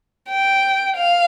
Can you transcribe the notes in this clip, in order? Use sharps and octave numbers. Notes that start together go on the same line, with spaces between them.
G5
F5